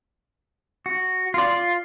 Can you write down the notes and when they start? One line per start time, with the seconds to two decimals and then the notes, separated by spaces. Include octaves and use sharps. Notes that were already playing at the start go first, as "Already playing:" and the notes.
0.86 F#4
1.34 F4 D5
1.53 F4